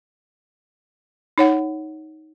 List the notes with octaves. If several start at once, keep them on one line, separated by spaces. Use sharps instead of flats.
D#4 C#5 F#5